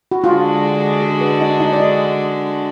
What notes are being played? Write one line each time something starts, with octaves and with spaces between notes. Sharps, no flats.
F#4
D3 G#3 D4 F4 F#4
G#4
B4
D#4 D#5
D#4 D#5
D5
D#4 D#5